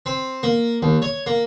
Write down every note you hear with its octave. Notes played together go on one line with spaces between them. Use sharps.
C4
A#3
D#2
C#5
A#3